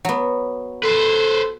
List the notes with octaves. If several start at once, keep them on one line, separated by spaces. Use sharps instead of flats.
F#3 B3
A4 B4 C5